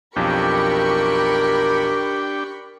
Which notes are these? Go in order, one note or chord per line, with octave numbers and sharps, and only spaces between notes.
B1 F2 D4 G4 A#4 G5 B5 C#6